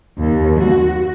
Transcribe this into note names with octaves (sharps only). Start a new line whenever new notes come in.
D#2
F#4